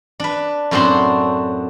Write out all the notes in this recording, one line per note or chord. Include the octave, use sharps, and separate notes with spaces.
D4 B4
F#2 A2 C4 D4 F#4 C6